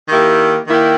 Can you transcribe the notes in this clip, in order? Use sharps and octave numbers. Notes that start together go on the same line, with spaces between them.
D#3 A#3 E4 G4
D#3 A#3 E4 G4